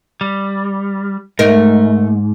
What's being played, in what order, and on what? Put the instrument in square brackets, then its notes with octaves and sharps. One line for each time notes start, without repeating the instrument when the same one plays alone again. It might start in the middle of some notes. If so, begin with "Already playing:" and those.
[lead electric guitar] G3
[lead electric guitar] G#2 [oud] A3 D#4 A#4